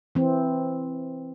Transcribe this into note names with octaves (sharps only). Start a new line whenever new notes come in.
E3 C4